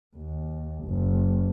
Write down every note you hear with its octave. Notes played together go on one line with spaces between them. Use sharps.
D#2
F#1